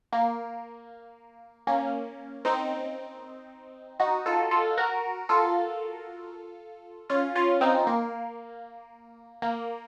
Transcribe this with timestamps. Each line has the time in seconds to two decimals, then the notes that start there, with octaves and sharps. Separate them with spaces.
0.13 A#3
1.67 A#3 C#4
2.45 C4 D#4
4.00 D#4 F#4
4.26 F4 A4
4.51 F4 A4
4.78 F#4 A#4
5.29 F4 A4
7.10 C#4 F4
7.35 C#4 F4
7.61 C4 D#4
7.87 A#3
9.42 A#3